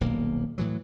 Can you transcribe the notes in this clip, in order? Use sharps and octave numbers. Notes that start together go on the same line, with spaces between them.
D#1 B1 A#3
A2 E3 F#3